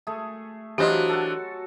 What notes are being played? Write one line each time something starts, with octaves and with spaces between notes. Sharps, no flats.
A3 G#4
E3 F#3 D4 F4 G4 G#4 C5 D#5
F#4 A4